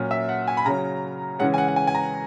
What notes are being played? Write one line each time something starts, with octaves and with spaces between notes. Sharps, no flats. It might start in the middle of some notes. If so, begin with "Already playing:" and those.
Already playing: A#2 F#3 C#4
E5
F#5
G#5
B5
C#3 F#3 C#4 A#5
C#3 E3 G#3 C#4 F#5
G#5
F#5
F#5
G#5
G#5
A#5